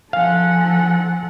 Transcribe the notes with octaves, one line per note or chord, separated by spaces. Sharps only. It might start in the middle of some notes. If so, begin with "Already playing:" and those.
F3 A4 F5 F#5 G#5